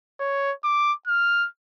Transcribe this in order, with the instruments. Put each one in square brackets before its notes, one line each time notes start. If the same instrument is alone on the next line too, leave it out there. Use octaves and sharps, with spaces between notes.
[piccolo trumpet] C#5
D6
F6